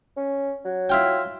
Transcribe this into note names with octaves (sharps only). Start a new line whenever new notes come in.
C#4
F#3
E4 F4 G5